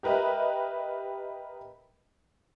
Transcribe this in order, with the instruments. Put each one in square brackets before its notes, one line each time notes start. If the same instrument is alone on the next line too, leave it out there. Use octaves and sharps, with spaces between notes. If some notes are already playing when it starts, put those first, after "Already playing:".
[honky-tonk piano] G4 A#4 B4 D#5 E5